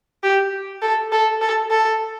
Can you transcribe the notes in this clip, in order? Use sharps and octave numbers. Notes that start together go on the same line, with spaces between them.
G4
A4
A4
A4
A4